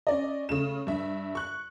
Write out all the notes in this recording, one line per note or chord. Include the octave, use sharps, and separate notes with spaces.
C#4 D5 D#5
C#3 A3 E7
G2 E5
C#6 F#6